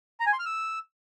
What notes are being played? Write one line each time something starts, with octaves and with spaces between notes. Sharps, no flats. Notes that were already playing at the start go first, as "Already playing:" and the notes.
A#5
G#5
C6
F6
E6